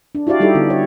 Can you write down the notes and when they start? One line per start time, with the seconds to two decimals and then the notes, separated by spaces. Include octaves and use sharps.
0.15 D4
0.27 E4 F#4 G4 D5 F5
0.40 G3 D#4 E4 G4 A4
0.55 D3 B3
0.70 F#4 C#5